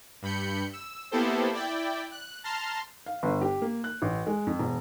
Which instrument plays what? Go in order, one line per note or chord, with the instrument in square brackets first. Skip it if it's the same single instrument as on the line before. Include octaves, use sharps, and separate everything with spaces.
[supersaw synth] G2 B5 G6 C#7
E6
A#3 B3 E4 G4 A4 C5
E4 D5 G5
F#6
A5 A#5 C6 F6
[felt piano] F5
G1
G4
A#3
F#6
A1
G#3
F2
E1